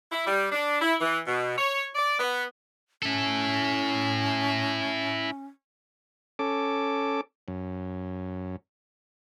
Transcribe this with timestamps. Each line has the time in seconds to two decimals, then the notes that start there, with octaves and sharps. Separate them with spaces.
0.12 E4
0.27 G3
0.52 D4
0.81 E4
1.01 E3
1.27 B2
1.58 C#5
1.95 D5
2.20 B3
3.03 C#4 E4 A4
6.39 C#4 A4 D6
7.48 F#2